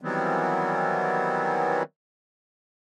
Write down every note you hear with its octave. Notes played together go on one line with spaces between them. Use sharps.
D#3 E3 F#3 G3 B3 C4